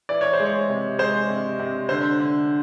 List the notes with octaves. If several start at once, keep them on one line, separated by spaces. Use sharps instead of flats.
E3 D5
C#5
C5
G#3
C#5
C3
G#3 C5
C3
C3
D3 C5
D3